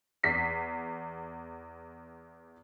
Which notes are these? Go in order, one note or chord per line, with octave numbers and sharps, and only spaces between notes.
E2 B6 C7